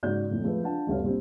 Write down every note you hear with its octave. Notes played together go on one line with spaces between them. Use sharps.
G#2 C#3 F#4 D5 G6
D#1 F2 A2
F3 G#3 A3 F4 G#4 B4
D4 F4 F#5 A5
G1 D2 G3 B3 C#4 F5
A#2 G3 C4